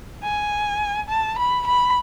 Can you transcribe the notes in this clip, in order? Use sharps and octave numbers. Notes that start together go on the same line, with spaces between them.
G#5
A5
B5
B5